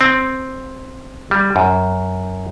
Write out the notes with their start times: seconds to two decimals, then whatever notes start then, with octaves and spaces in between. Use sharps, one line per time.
0.01 C4
1.31 G3
1.56 F#2